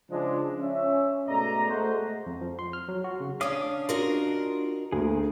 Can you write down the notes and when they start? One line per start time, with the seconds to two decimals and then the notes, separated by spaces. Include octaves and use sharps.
0.10 C#3 F3 G#3 D4
0.61 C#4 E5
1.28 G#2 B2 A3 D5 D#5 A#5
1.70 G#3 A3 F#4 C5
2.26 F2
2.41 F3
2.59 C6
2.73 F6
2.88 F#3
3.04 F#4
3.20 C#3
3.41 C#4 D4 F5 D6 D#6
3.89 D4 F4 F#4 A#4 D#5
4.92 D2 A#3 G#4